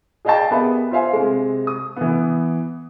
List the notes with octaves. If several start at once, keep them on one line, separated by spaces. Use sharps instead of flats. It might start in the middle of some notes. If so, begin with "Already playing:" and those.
G#4 D5 D#5 F5 G5 A5
B3 G4 G#4 A#4 E5 B5
F4 C5 E5 F5 G#5
C3 G#3
D#6
E3 B3